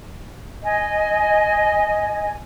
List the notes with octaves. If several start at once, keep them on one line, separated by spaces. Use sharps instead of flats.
D#5 G#5